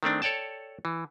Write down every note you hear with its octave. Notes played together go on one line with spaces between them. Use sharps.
D#3 A3 C4 D4
A4 C#5 D5 G5 A5
E3